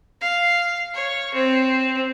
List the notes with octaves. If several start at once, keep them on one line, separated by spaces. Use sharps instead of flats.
F5
C#5
C4